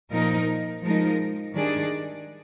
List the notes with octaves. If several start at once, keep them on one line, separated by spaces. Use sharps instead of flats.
A#2 F3 A#3 D#4 A#4
F3 G#3 D#4 A#4
D#3 G3 D4 G#4 D5